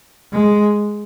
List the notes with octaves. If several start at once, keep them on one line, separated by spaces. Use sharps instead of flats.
G#3